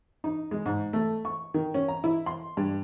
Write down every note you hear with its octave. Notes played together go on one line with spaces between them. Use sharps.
D#4
G#3
G#2
A3
C#6
D#3
C#4
A#5
E4
C6
G2